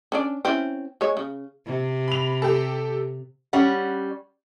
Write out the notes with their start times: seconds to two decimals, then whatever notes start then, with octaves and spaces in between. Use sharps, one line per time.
0.12 C#4 D4 D5
0.45 C4 C#4 E4
1.01 G#3 C#5
1.17 C#3
1.66 C3
2.08 B5 F7
2.42 G4 A4
3.53 G3 C#4 F#5